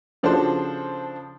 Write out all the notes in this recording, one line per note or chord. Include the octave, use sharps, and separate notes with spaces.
C#3 F3 D4 F#4 A4 C5